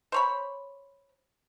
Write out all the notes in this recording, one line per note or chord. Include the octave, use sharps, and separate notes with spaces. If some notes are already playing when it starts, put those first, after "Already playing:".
C5 C#5 B5